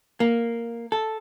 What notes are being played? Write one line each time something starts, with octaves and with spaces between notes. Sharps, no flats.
A#3
A4